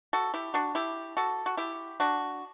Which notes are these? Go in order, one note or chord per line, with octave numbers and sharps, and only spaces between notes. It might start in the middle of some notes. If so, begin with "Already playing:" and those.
F#4 A4
E4 G4
D4 F#4
E4 G4
F#4 A4
F#4
E4 G4
D4 F#4